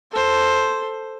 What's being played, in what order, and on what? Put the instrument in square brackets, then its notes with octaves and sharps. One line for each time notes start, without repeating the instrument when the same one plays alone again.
[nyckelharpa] A4 C5